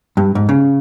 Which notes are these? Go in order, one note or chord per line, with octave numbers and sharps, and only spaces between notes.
G2
G#2
C#3